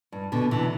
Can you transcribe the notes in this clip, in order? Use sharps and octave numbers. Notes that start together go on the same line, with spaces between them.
G2
B2 D3
C3 E3